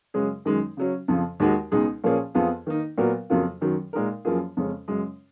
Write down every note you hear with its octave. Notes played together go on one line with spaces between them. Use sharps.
F#2 C#3 G#3 C#4 G#4
F#2 D#3 G#3 D#4
C#3 F#3 C#4
F2 C#3 F3
D#2 D#3 G#3 D#4 F#4
C#2 B2 G#3 D#4 G#4
A#2 F3 A#3 C#4 G#4
F2 F3 B3 F4 G#4
D#3 A#3 D#4
A#2 F#3 B3 F#4 A#4
F2 C#3 F#3 A#3 F4
F#2 D#3 F#3
A#2 G#3 D#4 A#4
F#2 F3 A#3 F4 G#4
F2 C#3 G#3 C#4
F#2 C#3 G#3